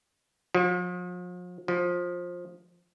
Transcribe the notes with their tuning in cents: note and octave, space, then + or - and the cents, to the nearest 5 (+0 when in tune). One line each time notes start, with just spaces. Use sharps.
F3 +40
F3 +15